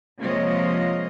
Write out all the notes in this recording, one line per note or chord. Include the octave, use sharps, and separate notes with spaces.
C3 F3 G#3 A#3 C#5 D#5